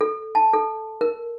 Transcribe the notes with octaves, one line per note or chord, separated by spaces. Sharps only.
A4
A5
A4
A#4